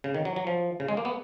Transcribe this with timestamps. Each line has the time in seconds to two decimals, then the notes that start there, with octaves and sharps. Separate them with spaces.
0.04 C#3
0.15 D#3
0.25 F#3
0.36 F#3
0.47 F3
0.80 C#3
0.88 G#3
0.97 A#3
1.05 B3